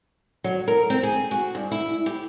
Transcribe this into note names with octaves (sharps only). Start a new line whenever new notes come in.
F#3
A#4
C4
G#4
F#4
G2
E4
G4